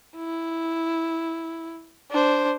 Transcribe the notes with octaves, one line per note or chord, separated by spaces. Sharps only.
E4
D4 C5